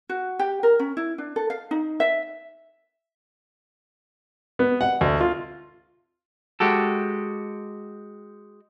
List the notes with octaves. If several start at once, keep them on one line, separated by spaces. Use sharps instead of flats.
F#4
G4
A#4
C#4
E4
D4
A4
F5
D#4
E5
B3
F#5
D2
F4
G#3 F#4 G4 A4